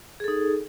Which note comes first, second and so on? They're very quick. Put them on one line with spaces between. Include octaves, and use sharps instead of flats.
G#4 A4 D#4